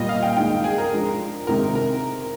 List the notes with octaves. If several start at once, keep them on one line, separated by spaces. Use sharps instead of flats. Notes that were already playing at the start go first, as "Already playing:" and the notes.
Already playing: A#2 G3 A#3 F4 D#5
F5
G5
D#3 G#3 D#4 G5
G#4
A#4
F3 G#3 D4
C3 D#3 G#3 C4 D#4 A#4
A#4